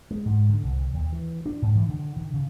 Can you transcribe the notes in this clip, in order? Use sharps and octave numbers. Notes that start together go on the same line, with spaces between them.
G#3
G#2
D3
C2
D#2
E3
D4
G#2
E3
D3
D#3
C#3